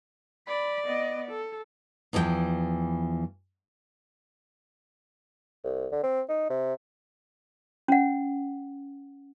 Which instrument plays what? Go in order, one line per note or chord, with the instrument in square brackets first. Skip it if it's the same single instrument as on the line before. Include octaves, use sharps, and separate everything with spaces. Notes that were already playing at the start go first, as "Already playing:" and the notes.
[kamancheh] D5 [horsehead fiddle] B5
[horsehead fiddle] B3 D#5
A4
[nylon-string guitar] E2 E3 F3 D5 G5
[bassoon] C2
D3
C4
D#4
C3
[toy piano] C#4 F#5